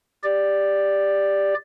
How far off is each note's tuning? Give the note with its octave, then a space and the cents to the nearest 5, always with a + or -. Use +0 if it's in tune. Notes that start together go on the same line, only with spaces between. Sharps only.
G4 +15 D5 +0